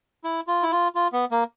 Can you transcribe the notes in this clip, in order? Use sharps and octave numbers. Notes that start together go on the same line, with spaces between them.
E4
F4
E4
F4
F4
B3
A#3